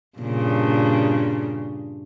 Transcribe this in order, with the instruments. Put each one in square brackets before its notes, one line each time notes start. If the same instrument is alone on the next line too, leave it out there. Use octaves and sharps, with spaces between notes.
[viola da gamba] G2 A#2 C#3